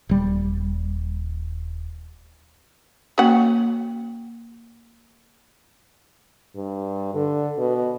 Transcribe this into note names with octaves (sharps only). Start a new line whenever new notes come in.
D#1 G3
A#3 C#4 F#4 F#5
G2
D3
B2